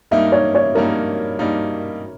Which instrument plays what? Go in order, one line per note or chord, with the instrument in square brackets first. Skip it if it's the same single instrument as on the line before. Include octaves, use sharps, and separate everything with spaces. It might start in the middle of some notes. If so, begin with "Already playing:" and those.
[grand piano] G2 G3 A#3 D#4 [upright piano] E5
[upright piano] C#5
C#5
[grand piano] G2 G3 A#3 D#4 [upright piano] A#4
[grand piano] G2 G3 A#3 D#4